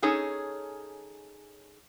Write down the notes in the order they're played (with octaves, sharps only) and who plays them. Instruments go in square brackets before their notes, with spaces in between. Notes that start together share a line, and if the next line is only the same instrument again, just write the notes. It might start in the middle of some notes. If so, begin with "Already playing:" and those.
[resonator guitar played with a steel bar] C#4 D#4 G#4 A4 C#5